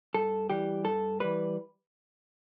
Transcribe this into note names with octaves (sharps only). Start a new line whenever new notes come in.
G2 A4
E3 G3 G4
G2 A4
E3 G3 B4